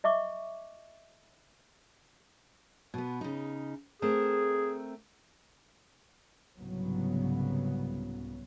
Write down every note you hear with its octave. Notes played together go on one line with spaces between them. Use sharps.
D#5 E5 C#6 D6
B2 B3
C#3 D#4
A3 C4 G#4 A#4
C2 G#2 C#3 F#3 B3